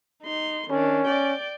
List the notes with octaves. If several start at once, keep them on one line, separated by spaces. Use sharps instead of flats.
D#4 C6
D#3 C#4 D4
D5 G5